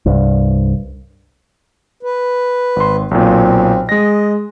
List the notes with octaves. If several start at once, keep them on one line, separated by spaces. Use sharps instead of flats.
C2 G2
B4
G#1 C6
B1 A#2 C4
G#3 D#5 A#6